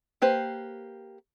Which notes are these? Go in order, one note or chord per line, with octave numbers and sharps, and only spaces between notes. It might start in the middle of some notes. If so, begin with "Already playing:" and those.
A#3 G4 B4 C5